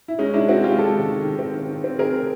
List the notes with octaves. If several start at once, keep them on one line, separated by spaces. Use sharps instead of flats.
E4
G#3 C#4 D#4
G#3 D4 E4
C4 E4 F#4
G#3 F4 G4
G#3 G4 A4
D#3
D#3
D#3
C4
D#3
D#3
C4
C4 G#4 A#4